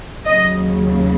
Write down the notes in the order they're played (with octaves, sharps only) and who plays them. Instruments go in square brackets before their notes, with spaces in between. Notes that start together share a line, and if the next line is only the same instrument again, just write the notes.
[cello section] D#2 C#3 F#3 D#5